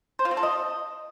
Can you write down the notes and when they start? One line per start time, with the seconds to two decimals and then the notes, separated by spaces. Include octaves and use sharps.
0.19 C5
0.25 F4
0.31 C4
0.37 A4
0.43 D#5